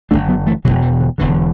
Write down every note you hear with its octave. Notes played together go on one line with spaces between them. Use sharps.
F#1 F#2 D3 A3 D4
F#3 B3
E3 A3
E1 E2 B2 D3 F#3
E3
D3
E1 E2 D3 E3